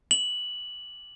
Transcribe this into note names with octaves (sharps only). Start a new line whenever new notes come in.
F#7